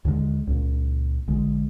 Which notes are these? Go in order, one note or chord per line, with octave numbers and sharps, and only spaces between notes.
D#2 D3 F#3 G#3
C#2 A#2
A#1 D3 G#3